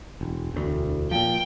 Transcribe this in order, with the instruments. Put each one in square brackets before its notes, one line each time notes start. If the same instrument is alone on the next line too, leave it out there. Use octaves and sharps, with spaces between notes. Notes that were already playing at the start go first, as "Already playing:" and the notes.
[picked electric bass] E1
E1 D2
[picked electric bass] A#2 F3 [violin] G5